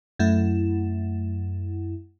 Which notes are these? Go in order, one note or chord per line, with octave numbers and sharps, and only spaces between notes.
F#2 A3 E4